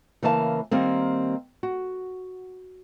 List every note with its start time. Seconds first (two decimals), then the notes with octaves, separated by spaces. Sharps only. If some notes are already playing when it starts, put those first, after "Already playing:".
0.22 C#3 E3 A#3 E5 F5 A5
0.71 D#3 G3 A#3 C4
1.63 F#4